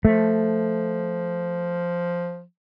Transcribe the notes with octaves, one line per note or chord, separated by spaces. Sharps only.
F3 A3